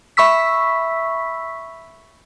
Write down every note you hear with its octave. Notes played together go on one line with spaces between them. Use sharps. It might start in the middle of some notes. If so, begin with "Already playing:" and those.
E5 B5 C#6 E6 B6